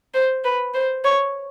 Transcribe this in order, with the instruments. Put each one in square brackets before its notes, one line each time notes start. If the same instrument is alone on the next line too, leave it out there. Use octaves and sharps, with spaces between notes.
[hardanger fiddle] C5
B4
C5
C#5